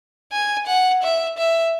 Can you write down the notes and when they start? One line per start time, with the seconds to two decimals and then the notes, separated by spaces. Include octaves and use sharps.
0.32 G#5
0.67 F#5
1.03 E5
1.37 E5